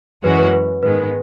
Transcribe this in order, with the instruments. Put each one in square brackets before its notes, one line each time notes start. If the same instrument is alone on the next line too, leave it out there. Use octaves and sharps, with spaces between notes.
[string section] F#2 E3 G#3 C#4 F#4 [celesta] B4
[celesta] B4
B4
[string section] G#2 D#3 G#3 B3 [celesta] B4